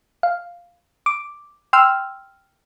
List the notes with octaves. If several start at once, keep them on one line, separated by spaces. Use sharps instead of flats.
F5
D6
G5 C6 E6 F6